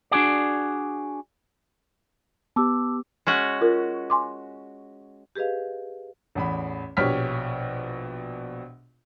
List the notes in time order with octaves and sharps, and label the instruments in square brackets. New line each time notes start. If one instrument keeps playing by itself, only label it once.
[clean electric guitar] D4 F#4 G#4 D5
[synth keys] B3 G4 [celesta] A5 D6 E6
[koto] G#3 C#4 F#4
[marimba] F4 A#4
G#5 C6 D6
G4 G#4 B4 D#5 F5
[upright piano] A1 E2 B5
A#1 B2 G4 C#5 F6 B6